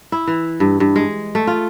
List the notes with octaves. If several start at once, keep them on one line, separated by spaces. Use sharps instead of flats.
E4
E3
G2
G2
G#3
A3
F4